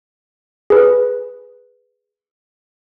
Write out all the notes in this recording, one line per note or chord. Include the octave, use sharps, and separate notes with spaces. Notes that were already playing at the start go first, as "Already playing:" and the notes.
G#4 B4